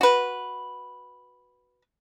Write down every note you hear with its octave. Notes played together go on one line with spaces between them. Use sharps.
F#4 B4